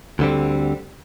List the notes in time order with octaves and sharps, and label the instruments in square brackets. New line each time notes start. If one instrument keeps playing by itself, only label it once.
[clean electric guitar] D2 D3 G3 C4